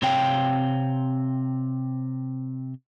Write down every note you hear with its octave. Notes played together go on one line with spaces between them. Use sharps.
C3 C4 C#5 F5 G5